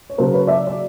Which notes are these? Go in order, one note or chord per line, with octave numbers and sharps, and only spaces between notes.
C#5
C#3 F#3 A#3 A#4 C5
B4 C#5
D5 E5
D5